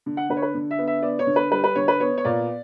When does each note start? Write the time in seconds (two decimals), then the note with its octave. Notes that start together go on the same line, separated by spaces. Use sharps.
0.06 D3
0.17 F#5
0.29 D3 B4
0.37 C#5
0.42 B4
0.55 D3
0.71 E5
0.79 B3
0.87 E5
1.02 B3 D5
1.19 C#5
1.27 D3
1.36 B4
1.51 G3 B4
1.64 B4
1.75 D3 C#5
1.88 B4
2.00 B3 C#5
2.18 C#5
2.25 A#2 D5